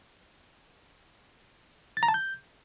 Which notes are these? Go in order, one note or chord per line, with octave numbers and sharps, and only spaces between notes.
A6
A#5
A5
G6